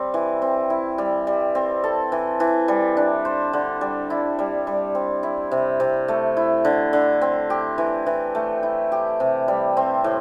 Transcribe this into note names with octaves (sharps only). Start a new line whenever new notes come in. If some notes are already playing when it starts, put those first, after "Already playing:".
Already playing: G3 C4
E3
C4
E4
G3
G3
C4
A4
E3
E3
G3
D4
C5
D3
G3
E4
G3
G3
C4
E4
C3
C3
A3
E4
D3
D3
C4
G4
E3
E3
A3
E4
G4
C3
G3
C4
A2